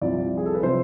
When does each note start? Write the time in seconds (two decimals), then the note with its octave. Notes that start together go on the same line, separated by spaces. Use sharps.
0.01 C2 C3 F3 D5
0.37 G#4
0.46 A4
0.55 B4
0.63 C3 F3 C5